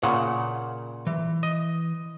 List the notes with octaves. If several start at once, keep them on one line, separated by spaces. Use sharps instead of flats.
A#2 C#3 F#5
E3
D#5